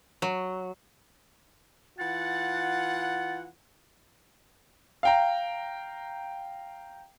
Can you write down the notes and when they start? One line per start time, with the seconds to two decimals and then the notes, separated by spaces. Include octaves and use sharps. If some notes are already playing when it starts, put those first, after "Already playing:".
0.22 F#3
1.98 E3 F4 F#5 A6
5.03 F5 G5 A#5